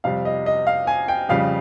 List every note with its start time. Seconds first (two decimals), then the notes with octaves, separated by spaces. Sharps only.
0.04 F2 C3 G3 F5
0.25 D#5
0.46 D#5
0.67 F5
0.87 G#5
1.08 G5
1.29 F2 C#3 G3 F5